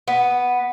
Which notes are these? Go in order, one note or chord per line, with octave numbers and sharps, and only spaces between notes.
B3